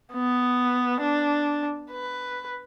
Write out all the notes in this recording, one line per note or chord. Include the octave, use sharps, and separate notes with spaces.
B3
D4
B4